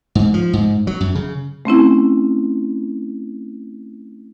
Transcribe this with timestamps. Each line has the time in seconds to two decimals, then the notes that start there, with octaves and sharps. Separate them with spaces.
0.15 G#2
0.34 F3
0.53 G#2
0.87 F#3
1.01 F#2
1.15 C#3
1.65 A3 C4 C#4 E4